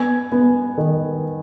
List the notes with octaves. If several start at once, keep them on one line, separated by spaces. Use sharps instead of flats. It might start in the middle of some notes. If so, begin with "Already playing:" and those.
Already playing: B3 G#5 G#6
B3
D#3